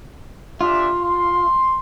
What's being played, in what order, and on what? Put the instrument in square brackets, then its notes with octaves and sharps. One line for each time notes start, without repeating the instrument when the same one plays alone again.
[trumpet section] D4 G4 E5 [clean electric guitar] F4
[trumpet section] C6